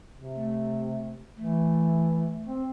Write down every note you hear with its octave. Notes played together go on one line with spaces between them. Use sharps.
C3
A3
E3 A3
C4